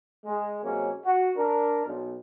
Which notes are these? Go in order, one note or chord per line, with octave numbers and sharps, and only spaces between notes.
G#3
C3 F#3 G#3 A#3 C#4
F#4
D4 A#4
B1